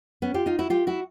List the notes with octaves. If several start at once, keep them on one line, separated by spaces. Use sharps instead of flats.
B3 C#4
F4 G4
D#4 F4
E4 F#4
F4 G4
E4 F#4